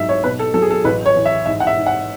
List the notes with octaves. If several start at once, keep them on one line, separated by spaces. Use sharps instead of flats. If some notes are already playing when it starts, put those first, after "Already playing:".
Already playing: G#2 F#3 E5
C#5
B2 B4
A4
F#3 A4
G#4
A4
A1 B4
C#5
E3
E5
G#2 E5
F#5
E5
G#2
F#5